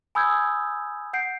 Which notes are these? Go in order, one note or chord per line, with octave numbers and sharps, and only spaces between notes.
G#5 B5 D#6 E6 G6 G#6
F#5 G6 C7 D7